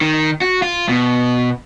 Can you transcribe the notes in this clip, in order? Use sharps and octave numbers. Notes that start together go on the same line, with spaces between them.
D#3
F#4
F4
B2